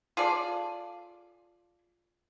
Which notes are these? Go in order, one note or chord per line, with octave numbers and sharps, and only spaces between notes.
F4 G#4 A4 D5